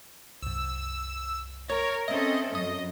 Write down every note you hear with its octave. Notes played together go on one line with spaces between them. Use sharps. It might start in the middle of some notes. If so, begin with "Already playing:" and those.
C2 F#2 E6
A#4 C#5
C4 C#4 A4 D#5 E5
F#2 D#5